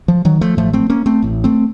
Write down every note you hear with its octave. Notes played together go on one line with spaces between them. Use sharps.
F3
D#3 F#3
F3 A3
A1 A2 F3 A3
A3 C4
A#3 C#4
A3 C4
A1 A2
A3 C4